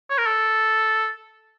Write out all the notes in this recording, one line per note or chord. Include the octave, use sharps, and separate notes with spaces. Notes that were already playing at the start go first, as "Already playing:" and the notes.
C#5
A#4
A4